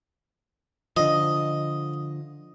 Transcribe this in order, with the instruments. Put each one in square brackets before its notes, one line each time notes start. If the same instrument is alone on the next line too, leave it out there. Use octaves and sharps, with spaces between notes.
[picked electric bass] D3 F3 [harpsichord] D#5